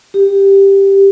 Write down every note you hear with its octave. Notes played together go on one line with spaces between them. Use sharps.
G4